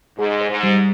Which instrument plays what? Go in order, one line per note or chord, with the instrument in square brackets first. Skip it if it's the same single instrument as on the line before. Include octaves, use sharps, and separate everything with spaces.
[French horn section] G#2 [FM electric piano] G#4
[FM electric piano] C5
[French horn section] G#2
[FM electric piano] G3